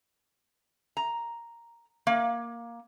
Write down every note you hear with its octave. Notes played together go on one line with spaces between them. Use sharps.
A#5
A#3